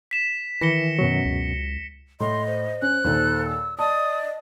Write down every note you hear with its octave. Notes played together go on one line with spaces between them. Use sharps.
B6 E7
D#3 E3 A#6 C#7 G7
F#2 B2 F#3
C#2
A2 D#5 C6
C5
C#4 F#6
D#2 A#2 D#3 A4
E6
D5 D#5 A5 D#6